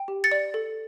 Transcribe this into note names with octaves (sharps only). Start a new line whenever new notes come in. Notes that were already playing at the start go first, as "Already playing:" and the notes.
Already playing: G5
G4
A6 C#7
D5
A4